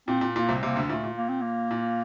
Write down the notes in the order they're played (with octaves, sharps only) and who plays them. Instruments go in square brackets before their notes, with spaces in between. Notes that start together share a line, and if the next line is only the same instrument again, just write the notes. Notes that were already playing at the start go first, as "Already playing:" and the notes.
[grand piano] A#2 [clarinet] C4
[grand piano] A#2
[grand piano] A#2 [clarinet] A#3
[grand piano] C2 C3
[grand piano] C2 C3 [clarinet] A#3
[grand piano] D2 D3
[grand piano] A#2 [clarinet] A3
[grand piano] A#2
[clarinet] A#3
C4
A#3
[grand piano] A#2